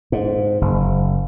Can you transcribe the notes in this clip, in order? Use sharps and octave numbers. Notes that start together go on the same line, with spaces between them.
G#2
F#1